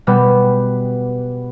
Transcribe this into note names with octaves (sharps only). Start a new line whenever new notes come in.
B2 G3 B3